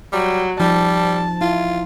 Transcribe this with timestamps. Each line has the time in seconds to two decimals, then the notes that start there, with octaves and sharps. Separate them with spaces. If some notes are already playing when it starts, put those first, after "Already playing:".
0.13 F#3 G3
0.60 F3 G3 D#4 A5
1.41 E4 F4